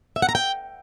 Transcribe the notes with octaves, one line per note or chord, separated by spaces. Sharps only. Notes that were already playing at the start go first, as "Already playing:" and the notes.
E5
F#5
A#5
G5